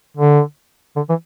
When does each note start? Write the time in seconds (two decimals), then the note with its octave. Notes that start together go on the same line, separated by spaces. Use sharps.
0.17 D3
0.96 D3
1.09 E3